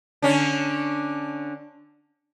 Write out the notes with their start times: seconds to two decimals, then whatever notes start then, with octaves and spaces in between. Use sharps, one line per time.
0.22 D3 C#4 D4